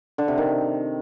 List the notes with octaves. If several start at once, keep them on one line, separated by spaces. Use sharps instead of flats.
D3
C3
D#3